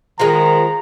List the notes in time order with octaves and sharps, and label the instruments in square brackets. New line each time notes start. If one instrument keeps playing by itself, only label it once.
[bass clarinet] D#3 [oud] F3 G#3 [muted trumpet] A#5